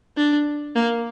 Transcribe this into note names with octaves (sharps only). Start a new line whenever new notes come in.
D4
A#3